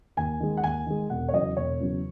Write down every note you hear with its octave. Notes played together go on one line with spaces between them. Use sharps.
D#2 G#5
D#3 G#3
F#5
D#2 G#5
D#3 G#3
E1 F#5
C#5
E2 C#3 F#3 D#5
E1 C#5
E2 C#3 F#3